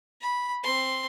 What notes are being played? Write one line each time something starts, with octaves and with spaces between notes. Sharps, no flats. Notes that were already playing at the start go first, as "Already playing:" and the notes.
B5
C4 C6